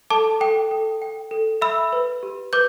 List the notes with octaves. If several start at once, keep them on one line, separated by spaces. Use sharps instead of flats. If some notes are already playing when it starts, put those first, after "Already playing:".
A4 A5 D6
A4 G5
A4
G5
A4
E5 B5 E6
B4
G4
B4 D6 G6